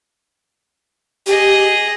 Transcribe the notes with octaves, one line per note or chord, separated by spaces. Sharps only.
G4 G#4 D#5